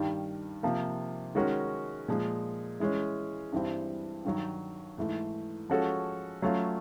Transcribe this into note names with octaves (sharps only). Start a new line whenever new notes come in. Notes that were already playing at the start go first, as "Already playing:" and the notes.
Already playing: G2 D#3 G3
C3 F3 A#3
D#3 G#3 C#4 F#4 A#4
A#2 F3 G#3
E3 G#3 C#4
G2 E3 G3 C4
G2 D#3 F#3
G#2 E3 A3
F3 G#3 C#4 F#4 A4
F#3 A3 C#4 F4